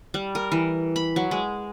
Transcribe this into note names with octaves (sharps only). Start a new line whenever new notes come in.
G3
A#4
E3
B5
F#3
G#3